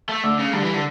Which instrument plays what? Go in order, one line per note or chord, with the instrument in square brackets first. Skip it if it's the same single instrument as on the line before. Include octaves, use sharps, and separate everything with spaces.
[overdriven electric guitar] A3
[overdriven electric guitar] D3 [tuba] A3
[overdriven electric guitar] C#3
[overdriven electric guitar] D3 [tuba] G3
[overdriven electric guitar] E3
D3